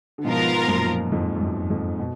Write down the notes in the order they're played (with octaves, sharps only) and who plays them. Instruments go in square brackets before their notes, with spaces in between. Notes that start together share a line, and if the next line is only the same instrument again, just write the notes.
[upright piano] D3
[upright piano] G#2 B2 [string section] F3 B3 F4 A#4
[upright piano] F#2 A#2
F2 G#2
F2
F#2
F2 G#2
B2